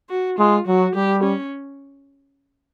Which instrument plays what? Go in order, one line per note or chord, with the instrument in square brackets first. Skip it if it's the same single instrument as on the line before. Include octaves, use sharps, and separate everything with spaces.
[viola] F#4
[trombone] G#3 [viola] F4
[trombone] F#3 [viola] F#4
[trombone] G3 [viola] G4
[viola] C#4